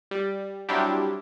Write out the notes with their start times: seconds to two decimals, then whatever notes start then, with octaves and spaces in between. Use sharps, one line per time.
0.11 G3
0.69 F#3 G3 C4 D4 E4 G4